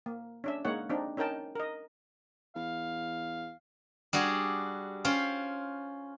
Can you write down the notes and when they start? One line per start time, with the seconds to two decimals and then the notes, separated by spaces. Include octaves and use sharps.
0.06 A#3
0.44 C#4 D4 E5
0.65 G#3 A#3 D#4 C#5 F#5
0.90 C4 D4 D#4
1.17 C#4 D#4 A#4 G5 A5
1.56 A#4 D#5
2.56 E2 F5
4.13 G3 D4 F#4 G#4
5.05 C#4 F4 C5 G5